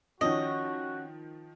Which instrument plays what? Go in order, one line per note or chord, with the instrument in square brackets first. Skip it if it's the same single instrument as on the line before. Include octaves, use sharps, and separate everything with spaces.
[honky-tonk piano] D#3 F3 [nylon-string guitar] C#4 [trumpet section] F#4 [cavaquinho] D#5